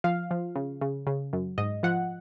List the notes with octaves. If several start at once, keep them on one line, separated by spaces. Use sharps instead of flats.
F3 F5
F3
C#3
C#3
C#3
F#2
G#2 D#5
F3 F#5